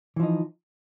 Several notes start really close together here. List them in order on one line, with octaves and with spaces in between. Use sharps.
E3 F3 D#4